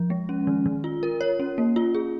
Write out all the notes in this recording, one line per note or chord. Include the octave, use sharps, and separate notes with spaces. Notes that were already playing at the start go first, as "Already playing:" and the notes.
Already playing: F3
G#3
C#4
D#3
D#3
F4
A#4
C#5
C#4
A#3
F4
G#4